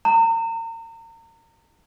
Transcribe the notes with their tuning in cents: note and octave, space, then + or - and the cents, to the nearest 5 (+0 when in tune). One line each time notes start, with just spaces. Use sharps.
A#5 -35